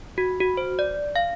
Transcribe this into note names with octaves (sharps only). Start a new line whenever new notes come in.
F#4
F#4
C5
D5
F5